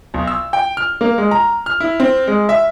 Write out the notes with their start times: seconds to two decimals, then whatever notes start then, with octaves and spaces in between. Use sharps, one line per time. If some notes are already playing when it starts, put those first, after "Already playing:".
0.14 B1
0.27 E6
0.53 G5
0.77 F6
1.01 A#3
1.18 G#3
1.31 A#5
1.66 F6
1.80 E4
2.00 C4
2.27 G#3
2.49 E5